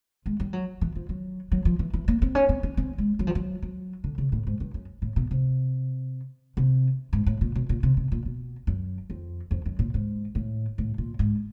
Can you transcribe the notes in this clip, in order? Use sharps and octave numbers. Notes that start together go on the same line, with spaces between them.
G#3
G3
F#3
E3
F3
F#3
F#3
F3
E3
E3
A#3
C4
C#4
C4
C#4
C4
G#3
F#3
F3
F#3
F#3
D3
C#3
A2
G#2
G2
F#2
A2
B2
C3
C3
G#2
A2
A#2
B2
A#2
C3
C3
A#2
B2
F#2
F2
F2
F#2
A#2
G#2
A2
A2
A#2
G#2